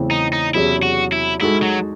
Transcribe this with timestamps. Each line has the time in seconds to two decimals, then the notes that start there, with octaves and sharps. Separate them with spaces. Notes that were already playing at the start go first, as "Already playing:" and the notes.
Already playing: E2 C#3 E3 A3 C4
0.11 D#4
0.33 D#4
0.55 E2 C3 F#3 C#4 E4 G#4
0.83 F#4
1.12 E4
1.41 G#3 D#4 E4 F#4 A4
1.62 F#3